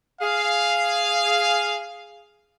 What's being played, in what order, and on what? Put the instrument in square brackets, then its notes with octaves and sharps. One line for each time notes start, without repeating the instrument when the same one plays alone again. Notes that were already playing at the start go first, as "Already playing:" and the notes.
[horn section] G#4 F5